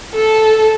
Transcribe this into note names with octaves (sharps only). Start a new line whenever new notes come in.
A4